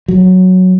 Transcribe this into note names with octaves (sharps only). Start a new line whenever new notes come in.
F#3